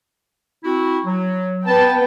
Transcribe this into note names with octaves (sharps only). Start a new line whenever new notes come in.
C4 E4 F#4
F#3
B3 B4 G5 A5